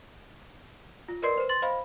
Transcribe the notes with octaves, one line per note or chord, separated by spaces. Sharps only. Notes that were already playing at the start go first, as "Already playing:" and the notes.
F4
A#4 B4 D5 D#5 C6 C7
B4 C5
C6 A6 F#7
C5 D#5 F5 B5